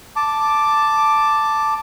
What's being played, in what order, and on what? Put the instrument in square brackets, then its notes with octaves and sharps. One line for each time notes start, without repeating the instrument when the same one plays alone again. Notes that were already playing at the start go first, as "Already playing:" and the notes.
[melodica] A5 D6